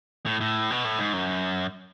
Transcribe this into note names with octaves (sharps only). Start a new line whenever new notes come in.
A2
A2
B2
A2
G#2
F#2